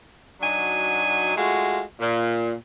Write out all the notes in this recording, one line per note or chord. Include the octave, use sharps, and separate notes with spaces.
F#3 D4 D#4 F#4 G#5
G#3 A3 F4 F#4
A#2